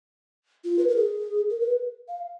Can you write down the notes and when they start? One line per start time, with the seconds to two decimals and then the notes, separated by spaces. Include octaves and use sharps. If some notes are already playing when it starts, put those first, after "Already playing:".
0.65 F4
0.79 B4
0.88 A#4
0.96 G#4
1.50 A#4
1.61 B4
2.09 F5